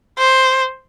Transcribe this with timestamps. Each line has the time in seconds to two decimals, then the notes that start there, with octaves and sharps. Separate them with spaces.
0.18 C5